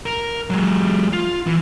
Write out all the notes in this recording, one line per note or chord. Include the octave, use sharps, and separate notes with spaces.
A#4
F#3 G#3
F4
E3